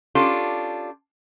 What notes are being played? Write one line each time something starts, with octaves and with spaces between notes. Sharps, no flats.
C#4 D4 F4 G4 A4